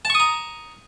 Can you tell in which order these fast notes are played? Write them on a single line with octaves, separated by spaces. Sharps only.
A5 C#6 D#6 A#5